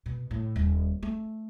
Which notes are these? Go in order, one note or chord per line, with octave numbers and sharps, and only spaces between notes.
B2
A2
D#1
A3